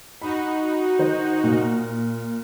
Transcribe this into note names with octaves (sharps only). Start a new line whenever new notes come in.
D#4 F#4 B5
D#3 C5
A#2